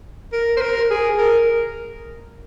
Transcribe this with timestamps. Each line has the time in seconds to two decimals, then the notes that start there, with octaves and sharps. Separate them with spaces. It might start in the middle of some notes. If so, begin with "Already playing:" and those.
0.32 A#4
0.57 C5
0.61 A#4
0.91 G#4
1.18 A#4